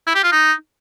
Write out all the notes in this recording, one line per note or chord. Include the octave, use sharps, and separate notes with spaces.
E4
G4
F4
D#4